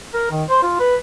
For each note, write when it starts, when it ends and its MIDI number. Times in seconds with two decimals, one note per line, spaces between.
0.14 0.30 70
0.31 0.44 51
0.49 0.62 72
0.63 0.80 65
0.80 0.96 71